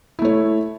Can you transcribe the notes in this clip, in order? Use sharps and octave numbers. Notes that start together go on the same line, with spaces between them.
A3 E4 C#5